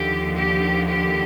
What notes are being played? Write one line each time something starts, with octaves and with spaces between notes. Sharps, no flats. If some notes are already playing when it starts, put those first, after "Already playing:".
Already playing: D#2 D3 F3 G4
G4
G4